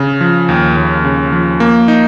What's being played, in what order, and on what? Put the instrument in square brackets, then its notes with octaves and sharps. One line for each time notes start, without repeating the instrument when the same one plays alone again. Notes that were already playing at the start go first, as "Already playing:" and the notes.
Already playing: [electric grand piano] C#3
F3
D#2
D#2
C#3
F3
A#3
D#4